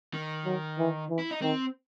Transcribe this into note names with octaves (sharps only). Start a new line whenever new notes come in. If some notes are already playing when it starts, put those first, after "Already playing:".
D#3
F#3
E3
E3
E4
D#4
D#3 C4